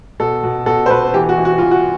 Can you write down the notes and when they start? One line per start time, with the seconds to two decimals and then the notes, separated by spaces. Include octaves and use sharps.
0.20 B2 A4
0.43 B2
0.66 B2 A4
0.86 C5
0.90 B2 B4
1.14 E3 G4
1.29 F#4
1.37 E3
1.45 F#4
1.58 E3 F4
1.71 F#4